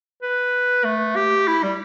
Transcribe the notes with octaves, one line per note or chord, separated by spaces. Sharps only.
B4
A3
G4
E4
G3